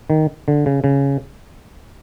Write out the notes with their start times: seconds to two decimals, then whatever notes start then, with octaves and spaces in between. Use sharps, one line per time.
0.10 D#3
0.48 D3
0.66 C#3
0.84 C#3